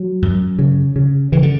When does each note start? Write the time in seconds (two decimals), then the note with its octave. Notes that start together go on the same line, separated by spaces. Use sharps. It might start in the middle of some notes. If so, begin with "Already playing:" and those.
Already playing: F#3
0.22 F#2
0.59 C#3
0.96 C#3
1.32 C#3 E3
1.43 D3